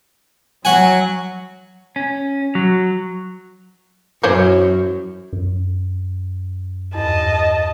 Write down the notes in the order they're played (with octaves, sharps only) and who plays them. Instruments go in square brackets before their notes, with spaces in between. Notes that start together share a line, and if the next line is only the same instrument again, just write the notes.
[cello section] F#3 [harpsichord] F#4 F#5 G#5
[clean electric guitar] C#4
F#3
[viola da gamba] F#2 [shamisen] E3 C5 C#5
[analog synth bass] F#2
[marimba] E2 G2 [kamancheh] D#5 A5